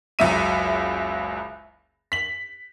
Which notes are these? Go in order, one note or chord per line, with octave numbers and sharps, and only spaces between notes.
F#1 C#2 F#3 E5 D#7
B6 F#7